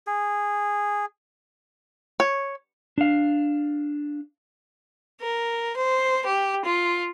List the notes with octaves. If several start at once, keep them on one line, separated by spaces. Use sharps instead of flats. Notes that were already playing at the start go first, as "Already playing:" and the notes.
G#4
C#5
D4 F5
A#4
C5
G4
F4